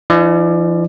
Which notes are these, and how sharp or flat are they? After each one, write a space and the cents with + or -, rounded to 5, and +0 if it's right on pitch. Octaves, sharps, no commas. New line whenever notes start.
F3 -45 D#4 +0 D5 +20